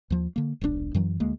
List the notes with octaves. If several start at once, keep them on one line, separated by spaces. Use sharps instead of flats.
D#2 F3
D3 A#3
D#1 B1 A2 D4
F#2 E3 F#3
D2 G#3 A#3